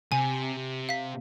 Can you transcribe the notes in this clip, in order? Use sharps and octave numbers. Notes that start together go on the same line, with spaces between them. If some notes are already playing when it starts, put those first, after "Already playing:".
C3 G#5
F5 B6